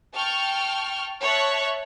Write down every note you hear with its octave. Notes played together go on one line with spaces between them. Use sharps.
G5 A5 C#6 F6
C#5 E5 A5 C#6 F#6